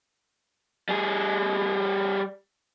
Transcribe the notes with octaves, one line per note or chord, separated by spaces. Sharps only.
G3 G#4